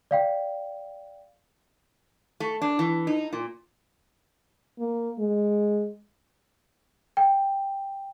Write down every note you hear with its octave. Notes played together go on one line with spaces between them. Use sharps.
D5 F5 G5
A3
D4
E3
D#4
A#2
A#3
G#3
G5